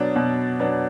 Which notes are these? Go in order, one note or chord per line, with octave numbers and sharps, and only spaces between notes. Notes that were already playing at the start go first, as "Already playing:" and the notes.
Already playing: B2 F#3 B3 D4
B2
F#3 B3 D4